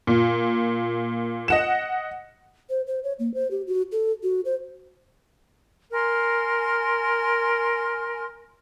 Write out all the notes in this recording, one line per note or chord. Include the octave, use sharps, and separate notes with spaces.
A#2
D#5 F#5 E7
C5
C5
C#5
A#3
C5
G4
F#4
A4
F#4
C5
A#4 G#5 C6 F6